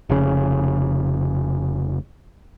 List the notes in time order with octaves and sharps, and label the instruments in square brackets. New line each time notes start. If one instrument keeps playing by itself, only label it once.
[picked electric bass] F1 C#3